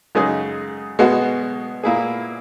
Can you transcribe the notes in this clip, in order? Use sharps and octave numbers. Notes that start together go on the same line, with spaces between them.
F#2 C#3 G#3 D#4 G#4
B2 G#3 B3 F#4
A#2 A#3 E4 G#4